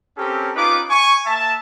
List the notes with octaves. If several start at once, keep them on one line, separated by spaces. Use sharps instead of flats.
C4 C#4 G4 A4 A#4
C#4 D#4 F4 B4 D6
G#5 C#6
A#3 E5 A5